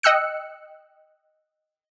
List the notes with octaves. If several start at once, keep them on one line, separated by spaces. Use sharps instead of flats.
D#5 G5 E6 F#6 C#7